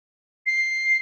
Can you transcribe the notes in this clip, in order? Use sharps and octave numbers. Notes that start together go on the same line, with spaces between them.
C7